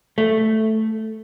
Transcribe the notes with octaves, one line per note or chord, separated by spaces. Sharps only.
A3